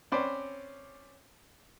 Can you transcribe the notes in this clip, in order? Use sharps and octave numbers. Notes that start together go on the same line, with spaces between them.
C4 C#4 B4 C5 D5